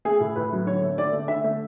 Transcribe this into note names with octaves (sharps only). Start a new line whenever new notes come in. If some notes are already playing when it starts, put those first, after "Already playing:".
A3 G#4
A2
A2 B4
F#3
D3 C#5
A3
D3 D5
A3
D3 E5
A3